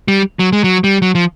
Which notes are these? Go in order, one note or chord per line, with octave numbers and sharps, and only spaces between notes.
G3
F#3
G#3
F#3
G3
F#3
F3